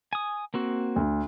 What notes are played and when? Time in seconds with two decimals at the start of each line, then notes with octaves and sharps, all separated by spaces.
0.13 G#5 D#6
0.54 A#3 C4 F#4
0.96 D2